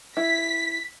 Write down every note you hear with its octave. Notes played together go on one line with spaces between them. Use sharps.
E4 B6